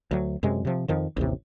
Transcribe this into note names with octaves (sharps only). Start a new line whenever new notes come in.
D2 F#3
F#2 C3 G#3
C3 F3
F2 D#3 F3
A1 D#2 C3